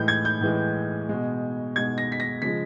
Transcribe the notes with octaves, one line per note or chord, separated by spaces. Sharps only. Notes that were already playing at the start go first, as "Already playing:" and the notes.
Already playing: A2 E3 G#3 G6
G#6
G6
A2 E3 G#3
B2 G#3
B2 G#3 G#6
A#6
B6
A#6
C#3 F3 G#3 B6